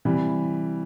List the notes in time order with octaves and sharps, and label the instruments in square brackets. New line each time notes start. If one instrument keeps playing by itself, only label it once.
[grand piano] C3 E3 G3